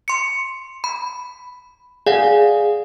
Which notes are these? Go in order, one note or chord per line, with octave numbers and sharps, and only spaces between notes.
C6 C#7
B5
G#4 D5 F5 F#5